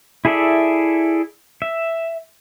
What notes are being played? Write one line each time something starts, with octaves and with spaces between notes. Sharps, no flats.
E4 G#4 A4 D5 E5
E5